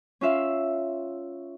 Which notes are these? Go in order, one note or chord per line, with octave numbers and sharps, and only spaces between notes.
C#4 F4 E5 F5